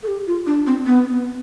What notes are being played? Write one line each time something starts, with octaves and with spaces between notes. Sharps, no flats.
A4
G4
F4
D4
C4
B3
B3